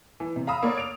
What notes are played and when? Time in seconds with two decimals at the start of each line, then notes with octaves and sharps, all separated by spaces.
0.20 E3
0.36 C3
0.47 F5 A#5 B5 D#6 E6
0.63 A#3 C#5 D5
0.78 D7 F7